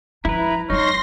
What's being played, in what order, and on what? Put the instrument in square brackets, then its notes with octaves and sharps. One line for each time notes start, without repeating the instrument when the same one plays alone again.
[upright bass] F3 F4 [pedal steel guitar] E4 B4 [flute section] A#5
[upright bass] F#3 B3 [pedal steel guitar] D#4 [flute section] C#5 C#6 F6 [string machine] C6 A#6